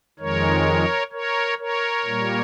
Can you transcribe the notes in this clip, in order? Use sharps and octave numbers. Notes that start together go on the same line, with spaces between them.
F2 D#3 G#3 A#4 C#5
A#4 C#5
A#4 C#5
A#2 G3 A#3